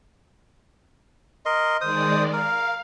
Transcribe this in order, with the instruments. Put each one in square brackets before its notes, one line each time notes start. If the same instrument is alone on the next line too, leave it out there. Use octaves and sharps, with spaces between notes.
[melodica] A#4 D#5 C6
[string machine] D#3 G#3 D5 [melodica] C5 D#6
[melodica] A#4 [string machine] F5